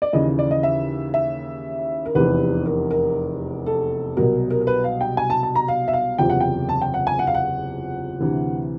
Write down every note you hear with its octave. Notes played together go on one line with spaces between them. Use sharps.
D5
D#2 C#3 E3 D#5
D5
D#5
E5
E5
A#4
F1 E2 C3 E3 B4
A#4
A#4
A4
C2 B2 F#3 A#4
A#4
A#4
B4
F5
G5
G#5
A5
A5
A#5
F5
E5
F5
F#1 E2 C3 F3 G5
F#5
G5
A5
G5
F#5
G#5
F#5
F5
F#5
D2 C3 E3